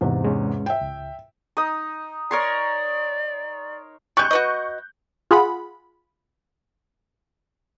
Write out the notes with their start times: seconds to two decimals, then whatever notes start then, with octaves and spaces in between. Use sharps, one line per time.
0.01 E2 G#2 C3
0.24 G#3 C#4
0.66 E5 G5
0.81 C#2
1.57 D#4 D#6
2.31 A#4 C#5 D5 C6
4.17 G3 G#3 C#6 F#6 G6
4.31 F#4 B4 D#5
5.31 F4 G#4 F#5 B5